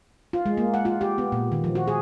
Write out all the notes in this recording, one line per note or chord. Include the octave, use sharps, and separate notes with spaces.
F4
G#3
A#3
F#5
F4
G4
B3
A#2
D#3
F3
F#4
G#4